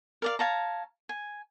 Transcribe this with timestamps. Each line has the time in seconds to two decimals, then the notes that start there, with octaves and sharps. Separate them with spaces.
0.22 A#4 D5 F5
0.39 C#5 F5 A5 A#5
1.09 G#5